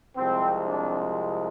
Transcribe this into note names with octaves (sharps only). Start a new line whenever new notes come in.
C2 C3 F3 G#3 C4
D4